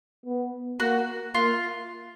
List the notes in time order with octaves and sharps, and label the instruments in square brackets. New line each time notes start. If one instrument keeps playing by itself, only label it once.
[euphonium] B3
[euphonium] A#3 [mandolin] F#4
[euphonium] A#3 [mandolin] F4